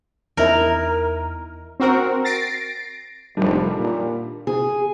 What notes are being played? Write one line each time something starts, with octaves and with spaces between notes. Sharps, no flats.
E2 D#4 E4 A#4
C4 F#4 A#4
A6 A#6 C7 D7
F1 D#3 G3 D4
A#2
G#4